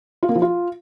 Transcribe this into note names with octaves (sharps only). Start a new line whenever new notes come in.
F4
A#3
F3
F4